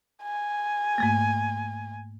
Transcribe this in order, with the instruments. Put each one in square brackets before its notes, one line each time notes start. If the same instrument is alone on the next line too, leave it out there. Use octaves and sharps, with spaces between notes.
[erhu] G#5
[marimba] G#2 A3 A#3